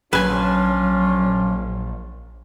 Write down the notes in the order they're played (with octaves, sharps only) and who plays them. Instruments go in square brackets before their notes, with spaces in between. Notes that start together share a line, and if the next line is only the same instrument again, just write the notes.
[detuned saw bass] A#1 [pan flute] F#3 [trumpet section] C#4 D4 F4 [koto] B4 G#5